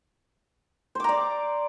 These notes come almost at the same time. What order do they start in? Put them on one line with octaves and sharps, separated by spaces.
C5 D6 A#5 D5